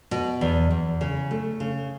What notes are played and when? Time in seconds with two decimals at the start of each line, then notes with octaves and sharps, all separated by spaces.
0.11 B2
0.41 E2
0.71 E2
1.01 C#3
1.31 A3
1.60 C#3